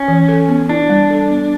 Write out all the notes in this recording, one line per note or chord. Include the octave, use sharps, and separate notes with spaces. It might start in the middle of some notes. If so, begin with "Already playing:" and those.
Already playing: C#4
E3
A4
B3
D4 E4
G3
A4
B3